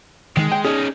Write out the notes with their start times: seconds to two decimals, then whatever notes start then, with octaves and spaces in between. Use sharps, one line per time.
0.37 D#3 G#3
0.52 G5
0.65 C#4 D#4 G#4